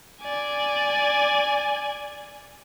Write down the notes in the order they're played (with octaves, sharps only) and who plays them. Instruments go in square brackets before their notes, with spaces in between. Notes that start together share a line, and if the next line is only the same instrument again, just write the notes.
[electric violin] D5 G#5